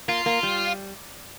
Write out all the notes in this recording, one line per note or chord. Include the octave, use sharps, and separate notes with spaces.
A#3 F4
A#3
G3